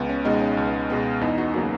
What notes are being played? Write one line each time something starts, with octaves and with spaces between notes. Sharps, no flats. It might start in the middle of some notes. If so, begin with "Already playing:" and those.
Already playing: C#2 B3
C#4
B2 G#3 B3 D#4
C#4
C#2
B2 G#3 B3
E2 B3 D#4
D#4 F#4
C#3 F#3 A#3 D#4 F#4